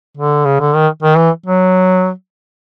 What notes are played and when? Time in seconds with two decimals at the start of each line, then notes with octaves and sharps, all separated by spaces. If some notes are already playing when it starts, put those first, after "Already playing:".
0.17 D3
0.45 C#3
0.60 D3
0.75 D#3
1.02 D#3
1.17 E3
1.46 F#3